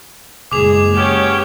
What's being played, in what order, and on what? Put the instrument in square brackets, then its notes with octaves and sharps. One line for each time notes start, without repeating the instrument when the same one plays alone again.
[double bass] F#1 G#3 [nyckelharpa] G#4 [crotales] D6 F7
[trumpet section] B3 C#4 [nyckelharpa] G4 C#5